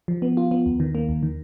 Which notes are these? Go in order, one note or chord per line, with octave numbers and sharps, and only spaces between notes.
F3
B3
F4
B3
D#2
D#3
A#3
D#2
D#3